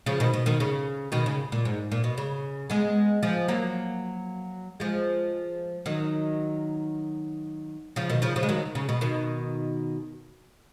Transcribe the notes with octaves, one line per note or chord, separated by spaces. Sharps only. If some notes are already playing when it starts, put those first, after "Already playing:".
C#3 F3
B2 D#3
B2
B2 D#3
C#3
B2 D#3
C#3
A#2
G#2
A#2
B2
C#3
G#3 B3
F3 G#3
F#3 A#3
F3 G#3
D#3 F#3
C#3 F3
B2 D#3
C#3 F3
C#3 F3
G#3
D#3 F#3
C#3
B2
B2 D#3